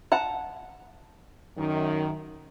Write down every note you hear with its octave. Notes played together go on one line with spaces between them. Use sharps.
F#5 A5 A#5
F#2 D#3